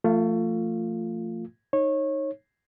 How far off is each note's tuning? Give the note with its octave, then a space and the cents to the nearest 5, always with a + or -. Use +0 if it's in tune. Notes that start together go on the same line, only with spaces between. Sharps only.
F3 -25 A3 +30 F4 +0
D#4 +0 C#5 -25